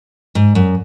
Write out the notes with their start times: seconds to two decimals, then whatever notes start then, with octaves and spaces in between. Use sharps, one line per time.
0.35 G#2
0.55 F#2